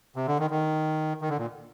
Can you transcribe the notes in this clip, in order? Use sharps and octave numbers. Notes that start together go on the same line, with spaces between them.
C3
D3
D#3
D#3
D#3
D3
A#2